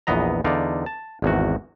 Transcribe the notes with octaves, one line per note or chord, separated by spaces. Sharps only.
A#1 E2 B3 D#5 A#5
E2 D3 D#4 D5 F5
A5
G#1 E2 F#4